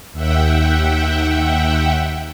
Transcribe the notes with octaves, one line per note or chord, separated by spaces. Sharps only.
D#2 E5 F#5 G5